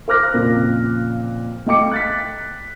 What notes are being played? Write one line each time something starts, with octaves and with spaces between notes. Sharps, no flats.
A#4 C5 D6 F6 F#6 A#6
F2 A#2 C#3
A3 D#5 G5 D6 C#7
F#6 A6 B6